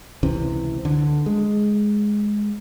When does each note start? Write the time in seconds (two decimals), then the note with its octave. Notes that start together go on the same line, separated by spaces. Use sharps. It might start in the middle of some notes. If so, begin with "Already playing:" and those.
0.23 C#2 C3 E3 C4
0.85 D3
1.26 G#3